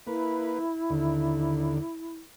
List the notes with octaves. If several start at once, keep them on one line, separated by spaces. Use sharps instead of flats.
A#3 E4 B4
D#2 D3